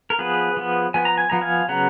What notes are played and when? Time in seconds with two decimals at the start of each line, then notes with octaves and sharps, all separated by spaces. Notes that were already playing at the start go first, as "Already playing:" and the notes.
0.10 A#4
0.19 F3 B3 G#4 B4
0.57 F3 B3
0.94 F3 B3 G#5
1.05 A#5
1.18 G#5
1.30 F3 B3 A#5
1.41 F5 G#5
1.68 C#3 F#3 B3 F#5 A#5